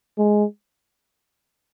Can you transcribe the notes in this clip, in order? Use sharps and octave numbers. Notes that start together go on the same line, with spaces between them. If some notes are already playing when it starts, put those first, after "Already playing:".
G#3